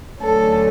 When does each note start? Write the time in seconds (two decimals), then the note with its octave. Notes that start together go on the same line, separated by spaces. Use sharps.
0.21 D2 D3 F#3 A3 C#4 A4